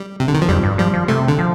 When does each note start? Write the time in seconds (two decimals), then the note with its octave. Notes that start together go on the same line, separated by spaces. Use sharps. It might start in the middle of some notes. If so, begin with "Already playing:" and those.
Already playing: G3
0.20 C3
0.28 D3
0.34 D#3
0.42 F3
0.49 F2 G3
0.63 G2
0.78 F3 G3
0.94 F3
1.08 C3 A3
1.28 D3
1.39 F3